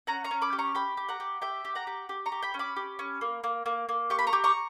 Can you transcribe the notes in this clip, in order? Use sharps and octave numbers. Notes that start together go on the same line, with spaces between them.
C#4 F#5 A#5
A#5 C#6
C#4
B5 D6
G4
A#5 C#6
G4 G5 B5
G4
F#5 A#5
G4
G4 E5 G5
G4
F#5 A#5
G4
G4
A#5 C#6
G4
G5 B5
C#4
B5 D6
G4
C#4
A#3
A#3
A#3
A#3
G4 C#6
B5
A#5 C#6
G4
A#5 C#6